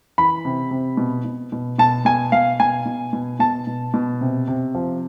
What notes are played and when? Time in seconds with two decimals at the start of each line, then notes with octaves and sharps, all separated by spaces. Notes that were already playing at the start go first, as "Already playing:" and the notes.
0.18 E3 B5
0.45 C3
0.71 C3
0.97 B2
1.25 B2
1.52 B2
1.79 B2 A5
2.05 B2 G#5
2.32 B2 F5
2.60 B2 G#5
2.86 B2
3.13 B2
3.40 B2 A5
3.67 B2
3.94 B2
4.21 C3
4.48 C3
4.75 F3